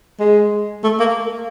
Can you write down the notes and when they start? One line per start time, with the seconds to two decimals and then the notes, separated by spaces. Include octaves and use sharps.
0.20 G#3
0.84 A3
0.99 A#3